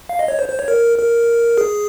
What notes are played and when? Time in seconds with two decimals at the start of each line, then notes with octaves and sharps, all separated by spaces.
0.09 F5
0.19 D#5
0.28 C#5
0.39 C5
0.49 C5
0.59 C#5
0.68 A#4
0.98 A#4
1.58 G#4